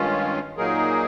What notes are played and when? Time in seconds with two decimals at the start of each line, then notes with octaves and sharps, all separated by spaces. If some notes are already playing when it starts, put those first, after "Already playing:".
Already playing: G2 D#3 G#3 C#4 F4
0.57 A#2 F#3 A#3 D#4 G#4 A#4